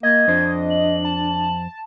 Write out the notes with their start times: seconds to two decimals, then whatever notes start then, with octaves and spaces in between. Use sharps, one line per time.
0.03 A#3 D#5 G#6
0.28 F2 D4 C5
0.70 F#7
1.05 A5